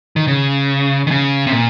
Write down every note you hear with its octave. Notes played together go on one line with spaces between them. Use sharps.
D#3
C#3
D#3
C#3
C3
A#2